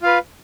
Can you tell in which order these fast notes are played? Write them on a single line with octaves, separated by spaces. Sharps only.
F4 F5 B4